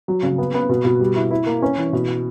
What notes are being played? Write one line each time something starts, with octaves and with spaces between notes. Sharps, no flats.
F#3
C#3
B3
B3
B2
B2
G3
E4
E4
A#3
C#4
E3
B2